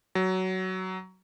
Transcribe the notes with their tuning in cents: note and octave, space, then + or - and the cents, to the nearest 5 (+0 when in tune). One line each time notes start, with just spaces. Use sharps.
F#3 +15